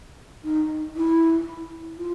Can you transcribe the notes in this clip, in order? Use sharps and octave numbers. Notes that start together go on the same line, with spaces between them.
D#4
E4
F4